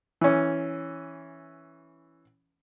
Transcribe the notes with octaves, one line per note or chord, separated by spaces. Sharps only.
E3 C#4